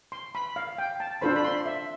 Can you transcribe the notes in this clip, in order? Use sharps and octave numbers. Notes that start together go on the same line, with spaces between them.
C6
B5
F5
G5
A5
D4 F4 A4 C5 B5
B5
C6
E5